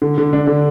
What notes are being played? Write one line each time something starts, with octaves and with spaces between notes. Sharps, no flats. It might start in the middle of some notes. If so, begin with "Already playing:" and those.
D3
D3
D4
D3